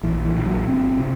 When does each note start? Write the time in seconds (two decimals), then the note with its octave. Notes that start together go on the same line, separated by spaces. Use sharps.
0.03 A#1 E3
0.25 E3
0.36 A#1
0.46 F#3
0.67 G1 C4
0.99 C3